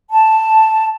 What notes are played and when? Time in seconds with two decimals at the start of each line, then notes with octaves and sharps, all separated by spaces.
0.12 A5